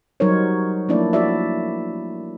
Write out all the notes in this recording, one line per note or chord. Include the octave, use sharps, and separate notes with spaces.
F#3 G3 D#4 A#4 C5 C#5
F3 A3 A#3 D4 E4 D5
E4 F#4 D5 E5